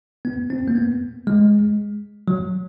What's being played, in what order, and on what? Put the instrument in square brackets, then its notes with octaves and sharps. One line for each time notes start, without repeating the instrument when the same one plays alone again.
[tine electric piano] B3
C4
A#3
B3
G#3
F#3